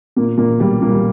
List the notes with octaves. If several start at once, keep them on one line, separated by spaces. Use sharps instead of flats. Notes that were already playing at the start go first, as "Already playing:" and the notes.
A#2 A#3
A#2 A#3
B1 G3
A#2 A#3
G3